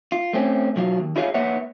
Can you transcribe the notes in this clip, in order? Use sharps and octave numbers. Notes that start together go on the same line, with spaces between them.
F4
A3 C4 C#4
B1 F#3 F4
D#2
E4 F4 G#4 C#5 D5 F5
A#3 B4 C#5 E5 F#5